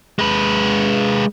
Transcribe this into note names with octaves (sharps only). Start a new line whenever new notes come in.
G#3 B4